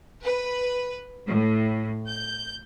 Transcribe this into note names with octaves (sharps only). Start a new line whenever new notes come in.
B4
A2
G6